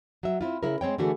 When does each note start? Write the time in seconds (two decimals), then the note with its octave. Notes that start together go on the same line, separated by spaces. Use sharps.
0.23 F#3 E5
0.41 C4 E4 F4
0.63 C#3 E4 G#4 A#4
0.81 G#3 C4 C#5 G5
0.98 D3 E3 A3 F#4 G#4 A4